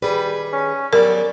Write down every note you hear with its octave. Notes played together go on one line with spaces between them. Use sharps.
D#3 G3 G#4 B4
C#4
F#3 G3 B3 A#4 D5